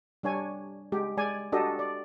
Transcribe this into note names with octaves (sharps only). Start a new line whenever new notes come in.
G3 D4 C#5 G#5
G#3 G4
G#3 D5 G#5
D4 F#4 G4 A4 D#5
D5